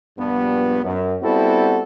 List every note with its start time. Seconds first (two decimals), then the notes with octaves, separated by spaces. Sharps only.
0.18 A#1 G2 B3
0.83 F#2
1.22 G3 B3 C4 E4 F#4 A4